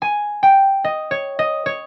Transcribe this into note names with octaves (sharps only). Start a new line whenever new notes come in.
G#5
G5
D#5
C#5
D#5
C#5